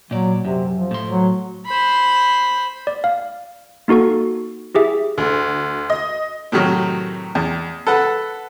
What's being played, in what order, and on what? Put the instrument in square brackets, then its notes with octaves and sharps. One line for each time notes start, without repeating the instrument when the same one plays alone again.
[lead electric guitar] A#2 D5 [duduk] F#3
[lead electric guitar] F#2 [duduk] C3
[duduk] F3
[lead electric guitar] A2 C6
[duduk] F#3
[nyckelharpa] C5 B5
[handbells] D5
F5
A#3 D#4 F#4 A4 C#6
E4 G4 G#4 E5
[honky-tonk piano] D2
D#5
[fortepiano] A2 C3 D#3 F#3
E2
A4 B4 F#5